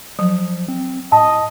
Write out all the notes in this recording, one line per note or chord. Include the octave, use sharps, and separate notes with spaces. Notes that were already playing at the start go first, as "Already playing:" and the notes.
F3 F#3
C4
A2 D#5 A5